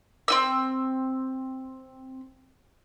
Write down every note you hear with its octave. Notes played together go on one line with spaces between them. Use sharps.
C4 D#4 E6